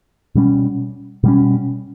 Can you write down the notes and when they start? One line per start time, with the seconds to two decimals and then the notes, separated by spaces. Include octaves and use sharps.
0.35 B2 G3 C#4
1.23 B2 G3 C#4